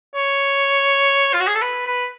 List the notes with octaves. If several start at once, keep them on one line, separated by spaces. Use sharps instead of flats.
C#5
F4
F#4
G#4
A4
B4
B4